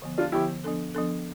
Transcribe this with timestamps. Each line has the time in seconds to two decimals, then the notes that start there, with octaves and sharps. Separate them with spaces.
0.02 D3 F3 B3
0.18 D4 F4
0.32 D3 F3 B3 E4 G4
0.64 F3 B3 D4 A4
0.94 F3 B3 D4 A4